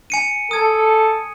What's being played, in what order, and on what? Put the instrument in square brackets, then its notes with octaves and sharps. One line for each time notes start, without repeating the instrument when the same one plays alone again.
[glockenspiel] G#5 C#7 D#7
[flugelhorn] A4 [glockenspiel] D#6 G#6